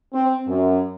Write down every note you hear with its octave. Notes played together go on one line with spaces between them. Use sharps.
C4
F#2